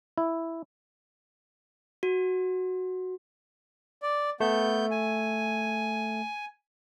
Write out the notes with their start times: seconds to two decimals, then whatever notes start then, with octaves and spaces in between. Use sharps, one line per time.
0.18 E4
2.03 F#4
4.02 D5
4.40 A3 B3 G6
4.91 G#5